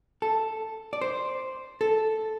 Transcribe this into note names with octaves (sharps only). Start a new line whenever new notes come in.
A4
D5
C5
A4